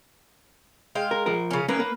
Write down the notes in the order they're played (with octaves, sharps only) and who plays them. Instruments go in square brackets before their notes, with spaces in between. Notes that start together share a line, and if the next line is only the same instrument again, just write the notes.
[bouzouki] G#3 F5 G5
[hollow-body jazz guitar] A#4
F3 A#4
[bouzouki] C#3 C#4
[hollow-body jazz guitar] A#3 C#4 A#4 [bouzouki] B4
[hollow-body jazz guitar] A#3